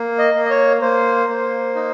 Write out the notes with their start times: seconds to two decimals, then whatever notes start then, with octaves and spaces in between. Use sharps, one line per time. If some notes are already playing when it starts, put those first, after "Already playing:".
Already playing: A#3
0.19 D#5
0.34 A#3
0.46 D#5
0.50 C#5
0.81 A#3 C5
1.29 A#3
1.75 D#4